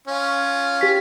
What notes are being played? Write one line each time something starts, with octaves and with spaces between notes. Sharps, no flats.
C#4 F4
G4 B6